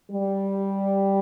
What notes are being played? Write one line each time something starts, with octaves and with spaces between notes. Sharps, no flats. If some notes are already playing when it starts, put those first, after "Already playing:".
G3